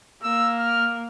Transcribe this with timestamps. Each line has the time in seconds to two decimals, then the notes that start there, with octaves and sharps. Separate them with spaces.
0.23 A#3 E6
0.59 F6